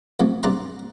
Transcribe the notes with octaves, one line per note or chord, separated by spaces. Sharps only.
F2 C3 A3
G2 C3 D5 F#5 A#5 C6